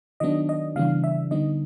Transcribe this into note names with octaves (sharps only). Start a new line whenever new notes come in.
D#3 F#3 B3 D4 D#5
D#5
C#3 E3 G3 B3 D4 F5
E5
D3 G3 B3 D#4 D#5